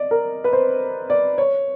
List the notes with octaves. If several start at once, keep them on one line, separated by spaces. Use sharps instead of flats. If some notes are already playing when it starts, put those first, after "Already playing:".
Already playing: D5 D#5
A#4
B4
C5
D5
C#5